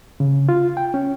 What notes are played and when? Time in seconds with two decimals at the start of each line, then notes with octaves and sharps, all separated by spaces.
0.20 C#3
0.49 F4
0.77 G5
0.94 C#4